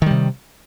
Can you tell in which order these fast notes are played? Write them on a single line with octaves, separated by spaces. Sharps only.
D#3 G3 C3